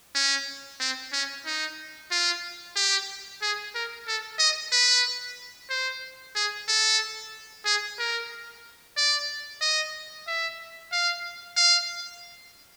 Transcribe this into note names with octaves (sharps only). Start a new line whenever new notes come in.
C#4
C4
C#4
D#4
F4
G4
G#4
A#4
A4
D#5
B4
C5
G#4
A4
G#4
A#4
D5
D#5
E5
F5
F5